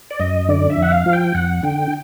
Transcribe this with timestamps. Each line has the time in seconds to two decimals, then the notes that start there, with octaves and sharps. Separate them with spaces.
0.11 D5
0.19 F#2 D#5
0.49 D3 D5
0.70 E5
0.77 F2
0.82 F#5
0.92 F5
1.06 F3
1.13 G5
1.34 F2 F#5
1.63 D3 G5